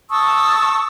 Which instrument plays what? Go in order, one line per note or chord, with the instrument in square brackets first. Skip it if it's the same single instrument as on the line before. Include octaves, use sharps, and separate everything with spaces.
[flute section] A5 C#6 D#6 E6